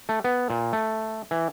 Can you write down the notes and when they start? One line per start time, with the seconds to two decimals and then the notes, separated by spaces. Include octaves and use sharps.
0.09 A3
0.24 B3
0.50 A#2
0.73 A3
1.31 E3